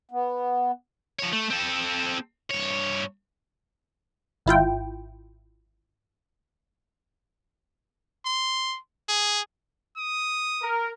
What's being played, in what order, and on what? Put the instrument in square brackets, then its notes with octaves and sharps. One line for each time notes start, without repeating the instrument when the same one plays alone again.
[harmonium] B3
[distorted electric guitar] F3 C#5
A3
C4 A4
G2 C#5
[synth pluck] G#1 E4 F4 G5
[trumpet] C6
G#4
[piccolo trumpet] D#6
[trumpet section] A#4